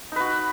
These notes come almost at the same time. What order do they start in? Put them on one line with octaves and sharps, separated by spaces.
D#4 B4 F#4